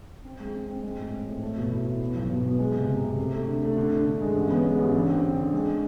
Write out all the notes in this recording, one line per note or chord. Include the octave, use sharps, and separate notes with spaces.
C4
G#3
C4
C4
G#3
A2
C4
A2
A3
B2
E4
E4
B3
B1
B2
B3
G#3
C3
C3
C3
A3
A3
D3
A3
D3
D3
D3
G#3
A1
B3
G#3
A1
D3
C4
D3
D3
G#3